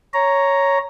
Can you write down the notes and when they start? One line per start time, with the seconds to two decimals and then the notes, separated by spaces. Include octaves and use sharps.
0.13 C#5 A#5